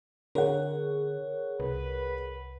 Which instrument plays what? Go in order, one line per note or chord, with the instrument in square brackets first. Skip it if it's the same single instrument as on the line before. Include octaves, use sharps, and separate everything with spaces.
[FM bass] D3 [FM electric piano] G#4 A#4 [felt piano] C#5 F#5
[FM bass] C2 [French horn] B4